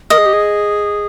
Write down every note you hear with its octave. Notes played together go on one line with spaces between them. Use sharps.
A#4 D#5
G#4
G4
G#4